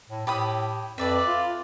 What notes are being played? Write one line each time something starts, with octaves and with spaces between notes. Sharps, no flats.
A2
A2 G4 B5 D#6
F2 B4 D5 E5
F4